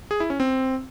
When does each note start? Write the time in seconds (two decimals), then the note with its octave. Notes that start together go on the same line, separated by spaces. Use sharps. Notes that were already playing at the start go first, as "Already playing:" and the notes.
0.11 G#4
0.20 E4
0.30 C#4
0.40 C4